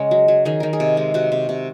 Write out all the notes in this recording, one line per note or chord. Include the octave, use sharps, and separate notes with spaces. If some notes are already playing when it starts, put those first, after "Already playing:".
Already playing: C#3 G#3 C#5
F#3
F#3
D#3 G#4
D#3 A#4
G#4
C3
G#3
C3 F#4
C3
C3